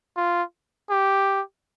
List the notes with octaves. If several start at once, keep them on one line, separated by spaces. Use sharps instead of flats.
F4
G4